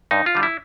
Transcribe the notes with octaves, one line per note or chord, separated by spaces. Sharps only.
G2 D#4
F4
D3 G3
E4